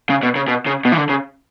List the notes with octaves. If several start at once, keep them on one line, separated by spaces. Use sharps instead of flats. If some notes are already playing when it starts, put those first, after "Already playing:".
C#3
B2
C#3
B2
C#3
B2
E3
D3
C#3